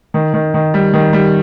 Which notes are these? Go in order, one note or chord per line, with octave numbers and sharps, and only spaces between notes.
D#3
D#3
D#3
G3
D#3
G3